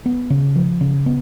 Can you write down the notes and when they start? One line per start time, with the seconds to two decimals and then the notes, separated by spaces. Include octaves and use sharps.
0.06 B3
0.30 C#3
0.56 F3
0.81 C#3
1.06 B3